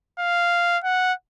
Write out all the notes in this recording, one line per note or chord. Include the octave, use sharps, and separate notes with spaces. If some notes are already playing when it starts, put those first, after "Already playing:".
F5
F#5